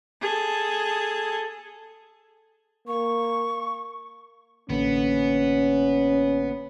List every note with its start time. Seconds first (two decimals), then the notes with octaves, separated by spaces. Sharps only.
0.22 G#4 A4
2.88 A#3 C#6
4.70 A1 D3 A#3 B3 C#4